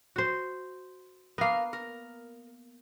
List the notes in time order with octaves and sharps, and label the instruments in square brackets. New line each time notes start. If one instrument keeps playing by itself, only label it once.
[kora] F#4 C5
[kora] A#3 B3 [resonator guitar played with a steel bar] A#4 F5
[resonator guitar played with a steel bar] A#4